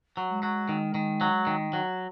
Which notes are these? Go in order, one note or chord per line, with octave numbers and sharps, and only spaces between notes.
F#3
G#3
F#3
D#3
D#3
F#3
D#3
F#3